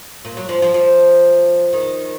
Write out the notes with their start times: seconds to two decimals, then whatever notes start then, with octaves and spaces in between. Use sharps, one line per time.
0.25 A#2
0.37 F#3
0.49 F3
0.62 F3
0.74 F3
1.73 D#3